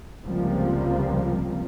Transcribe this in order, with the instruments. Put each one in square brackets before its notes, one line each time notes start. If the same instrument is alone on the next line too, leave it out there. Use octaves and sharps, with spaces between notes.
[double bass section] C#2 C3 F3 G3 A#3 C4